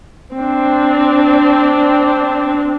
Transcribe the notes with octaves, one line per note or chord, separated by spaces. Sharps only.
C4 D4